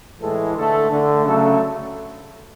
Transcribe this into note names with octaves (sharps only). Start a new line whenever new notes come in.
A2 E3 G#3 A4
D3 A3 A4
D3 A3
C#3 F#3 A3 A4